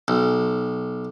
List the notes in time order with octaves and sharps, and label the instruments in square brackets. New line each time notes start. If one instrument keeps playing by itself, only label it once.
[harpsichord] B1